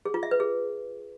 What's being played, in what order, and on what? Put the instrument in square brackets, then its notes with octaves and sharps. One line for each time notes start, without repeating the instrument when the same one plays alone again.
[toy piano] G#4
F4
E5
B4
G#4